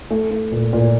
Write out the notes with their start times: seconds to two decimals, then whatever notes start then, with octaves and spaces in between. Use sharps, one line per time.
0.11 A3
0.31 A3
0.52 A#2
0.73 A#2